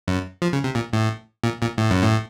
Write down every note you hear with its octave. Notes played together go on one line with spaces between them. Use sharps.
F#2
F3
C#3
C3
A#2
A2
A#2
A#2
A2
F#2
A2